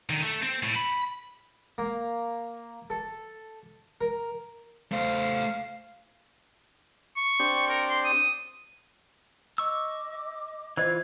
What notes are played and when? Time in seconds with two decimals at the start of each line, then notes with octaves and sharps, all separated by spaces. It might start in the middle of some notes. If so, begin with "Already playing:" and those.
0.10 D3 D#3
0.22 A3
0.42 C4
0.63 A2
0.76 B5
1.78 A#3
2.90 A4
4.01 A#4
4.92 A3 C5 F5
7.16 C#6
7.40 C4 D4 G4
7.69 A#4
7.90 C6
8.05 D#6
9.58 D#5 C#6 D6 E6
10.77 E3 F4 C5 D#5 G#6